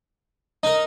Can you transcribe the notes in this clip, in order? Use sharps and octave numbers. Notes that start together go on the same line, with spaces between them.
D#4 A#4 D#5